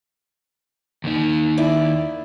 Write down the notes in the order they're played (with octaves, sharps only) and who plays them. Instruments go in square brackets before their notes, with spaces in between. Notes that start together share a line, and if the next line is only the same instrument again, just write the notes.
[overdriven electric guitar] D#2 D#3
[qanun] E4 D5